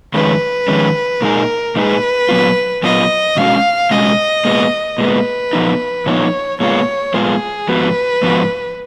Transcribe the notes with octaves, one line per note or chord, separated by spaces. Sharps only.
F2 D#3 G#3 C#4 B4
F2 D#3 G#3 C#4
A#2 G#3 D#4 G#4 A#4
A#2 G#3 D#4 G#4 B4
A#2 F#3 B3 F4
A#2 F#3 B3 F4 D#5
B2 G#3 C#4 F#4 F5
B2 G#3 C#4 F#4 D#5
A#2 G#3 B3
A#2 G#3 B3 B4
A#2 F3 B3 D#4
A#2 F3 B3 D#4 C#5
A#2 G#3 B3 F4 C#5
A#2 G#3 B3 F4 G#4
G#2 F3 B3 F#4 B4
G#2 F3 B3 F#4